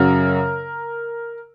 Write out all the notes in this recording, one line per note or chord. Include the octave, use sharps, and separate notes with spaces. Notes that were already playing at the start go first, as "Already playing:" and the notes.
Already playing: F#2 C#3 F#3 A#4